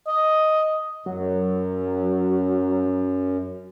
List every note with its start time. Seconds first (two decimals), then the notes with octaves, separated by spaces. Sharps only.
0.07 D#5
1.06 F#2 F#3